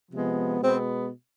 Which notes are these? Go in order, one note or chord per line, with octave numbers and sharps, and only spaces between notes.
C3 F3 G#3 B3
B2 G#3 B3 C4